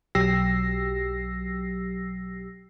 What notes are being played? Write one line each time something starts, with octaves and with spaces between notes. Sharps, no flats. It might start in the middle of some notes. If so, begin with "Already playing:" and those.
B1 F#3 G4 E6 A#6 C7